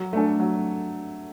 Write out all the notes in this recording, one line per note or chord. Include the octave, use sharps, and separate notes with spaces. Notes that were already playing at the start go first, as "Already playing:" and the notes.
Already playing: F#3
A3 D4 A4
F#3